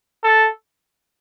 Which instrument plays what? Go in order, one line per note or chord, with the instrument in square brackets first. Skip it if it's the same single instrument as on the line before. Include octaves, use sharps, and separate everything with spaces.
[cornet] A4